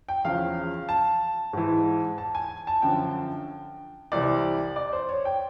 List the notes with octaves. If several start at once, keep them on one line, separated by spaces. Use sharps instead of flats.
G5
E2 C#3 F3 F5
A5
G#2 E3
A5
G#5
A5
F#2 D3 F3 G5
C2 C3 E3 D5
D5
C5
C#5
G5